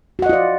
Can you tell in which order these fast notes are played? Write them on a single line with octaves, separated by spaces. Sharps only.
F#4 F#5 D#5 F4 D5